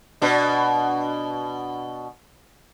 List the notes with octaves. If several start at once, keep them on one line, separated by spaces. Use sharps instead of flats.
B2 D4